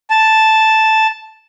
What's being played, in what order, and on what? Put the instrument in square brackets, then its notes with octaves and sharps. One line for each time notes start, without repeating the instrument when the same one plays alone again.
[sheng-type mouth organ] A5